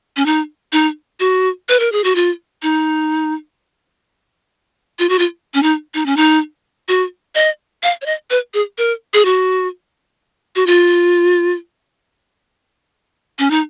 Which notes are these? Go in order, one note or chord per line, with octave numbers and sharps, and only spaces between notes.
C#4
D#4
D#4
F#4
B4
A#4
G#4
F#4
F4
D#4
F4
F#4
F4
C#4
D#4
D#4
C#4
D#4
F#4
D#5
F5
C#5
D#5
B4
G#4
A#4
G#4
F#4
F#4
F4
C#4
D#4